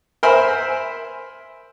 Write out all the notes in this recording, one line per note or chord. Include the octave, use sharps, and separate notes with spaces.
A#4 C5 E5 G#5 B5